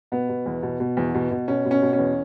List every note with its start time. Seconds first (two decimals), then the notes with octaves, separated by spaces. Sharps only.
0.12 B2 B3
0.29 B2
0.46 E2
0.63 B2
0.80 B2
0.97 E2
1.15 B2
1.31 B2
1.48 B2 C#4
1.65 B2
1.71 C#4
1.82 B2
1.93 C#4
1.98 E2